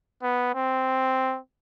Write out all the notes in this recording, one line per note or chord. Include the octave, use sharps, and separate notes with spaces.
B3
C4